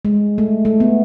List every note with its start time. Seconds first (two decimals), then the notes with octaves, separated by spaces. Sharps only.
0.05 G#3
0.38 A3
0.65 A3
0.80 B3